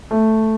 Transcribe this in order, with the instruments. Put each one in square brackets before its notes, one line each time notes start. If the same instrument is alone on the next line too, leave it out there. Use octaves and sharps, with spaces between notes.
[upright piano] A3